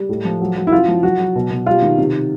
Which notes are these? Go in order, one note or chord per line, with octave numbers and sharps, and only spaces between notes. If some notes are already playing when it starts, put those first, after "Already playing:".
Already playing: G3
A2
F3
F#3
F#3
E4
F#2 F4
F3
F#3 F#4
F#3
B2
B2
G3 F4
D#3
C3